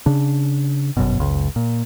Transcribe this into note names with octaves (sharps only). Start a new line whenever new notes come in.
C#3 D4
G1 F#2 B2
F#1 C#2
A#2